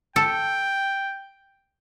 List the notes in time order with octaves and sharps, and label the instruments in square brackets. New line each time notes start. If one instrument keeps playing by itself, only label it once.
[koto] A4 [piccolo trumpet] G5